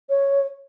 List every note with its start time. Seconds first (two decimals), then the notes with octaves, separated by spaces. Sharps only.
0.10 C#5